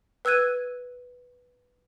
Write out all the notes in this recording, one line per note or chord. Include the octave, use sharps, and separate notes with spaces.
B4 E6 F#6 G#6 D#7